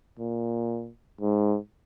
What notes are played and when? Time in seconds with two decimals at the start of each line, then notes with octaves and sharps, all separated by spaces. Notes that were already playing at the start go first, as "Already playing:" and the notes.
0.19 A#2
1.21 G#2